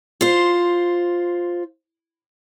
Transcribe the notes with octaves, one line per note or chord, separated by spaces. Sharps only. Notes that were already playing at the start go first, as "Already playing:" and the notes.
F4 C5